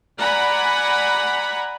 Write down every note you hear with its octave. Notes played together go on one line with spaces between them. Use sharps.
D5 F#5 G#5 A#5 B5